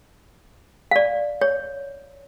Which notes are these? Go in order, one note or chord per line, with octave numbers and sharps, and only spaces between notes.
F5
D5
C#5